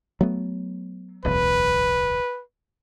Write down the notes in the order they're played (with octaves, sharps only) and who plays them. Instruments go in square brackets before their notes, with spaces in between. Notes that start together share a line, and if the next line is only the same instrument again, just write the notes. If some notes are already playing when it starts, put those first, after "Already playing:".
[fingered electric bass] F#3 A3 B3
[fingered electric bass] D1 B1 E2 [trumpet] B4